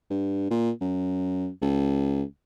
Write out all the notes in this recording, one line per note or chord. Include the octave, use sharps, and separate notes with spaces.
G2
A#2
F#2
C#2